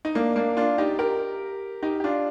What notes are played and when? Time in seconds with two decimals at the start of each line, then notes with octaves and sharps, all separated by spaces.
0.05 D#4
0.15 A#3 D4
0.36 A#3 D4
0.57 D4 F4
0.78 D#4 G4
0.99 G4 A#4
1.83 D#4 G4
2.00 G4
2.04 D4 F4